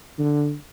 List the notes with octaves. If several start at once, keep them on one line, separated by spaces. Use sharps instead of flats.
D3